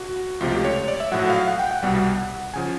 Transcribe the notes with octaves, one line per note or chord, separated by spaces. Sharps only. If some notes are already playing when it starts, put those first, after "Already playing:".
Already playing: F#4
C#2 C3 F3 A3 F4
G4
C#5
C#5
D5
E5
A#1 A2 F#3 F#5
F5
F#5
G5
F#5
C2 B2 G3
C#3 F3 G#5